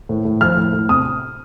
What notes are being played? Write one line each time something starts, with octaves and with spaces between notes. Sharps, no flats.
A2
A2
F3 F6
A2
A2
C3 D#6